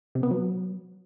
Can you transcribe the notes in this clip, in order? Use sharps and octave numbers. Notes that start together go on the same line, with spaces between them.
C3
B3
F#3